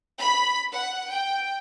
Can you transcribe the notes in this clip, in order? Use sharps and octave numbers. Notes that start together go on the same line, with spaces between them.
B5
F#5
G5